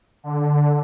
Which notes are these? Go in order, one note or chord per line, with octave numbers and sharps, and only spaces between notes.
D3